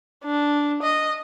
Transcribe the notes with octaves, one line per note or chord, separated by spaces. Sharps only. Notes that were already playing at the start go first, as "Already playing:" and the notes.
D4
D#5